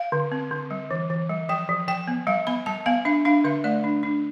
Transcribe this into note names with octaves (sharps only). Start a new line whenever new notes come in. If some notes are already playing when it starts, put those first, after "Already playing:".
Already playing: F5
D3
C4
D3
G3
E3
E3
G3
F3 G5
F3
F3 G5
B3
G3 F5
B3 B5
G3 A5
B3 F5
D4 E5
D4 F5
D3 E5
A3 D5
D4
D4